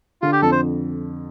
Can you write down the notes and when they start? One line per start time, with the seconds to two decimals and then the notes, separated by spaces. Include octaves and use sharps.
0.22 D3 F4
0.32 G4
0.42 F2 A4
0.52 C5